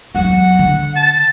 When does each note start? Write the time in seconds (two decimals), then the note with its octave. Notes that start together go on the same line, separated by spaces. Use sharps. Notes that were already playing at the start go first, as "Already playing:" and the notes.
0.15 E2 F#3 F#5
0.59 D3
0.96 A5